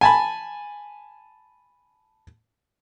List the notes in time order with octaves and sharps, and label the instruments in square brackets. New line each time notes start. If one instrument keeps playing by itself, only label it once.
[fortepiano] G#5 A5 B5